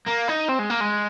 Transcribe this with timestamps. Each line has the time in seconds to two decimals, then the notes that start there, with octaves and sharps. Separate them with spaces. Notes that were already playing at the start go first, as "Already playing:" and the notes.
0.08 A#3
0.29 D#4
0.49 C4
0.59 G#3
0.70 A#3
0.81 G#3